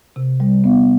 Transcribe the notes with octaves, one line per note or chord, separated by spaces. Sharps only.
C3
G3
B3